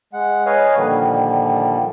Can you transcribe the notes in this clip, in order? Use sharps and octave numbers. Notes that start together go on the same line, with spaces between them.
G#3 F#5
B4 C#5 D#5 F5 G#5
A#2 D3 D#3 F3 G3 A#3